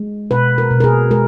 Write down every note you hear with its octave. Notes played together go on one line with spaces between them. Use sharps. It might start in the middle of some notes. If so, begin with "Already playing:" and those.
Already playing: G#3
B2 B4
A#4
B2
A#4
G#4
G#3 A#4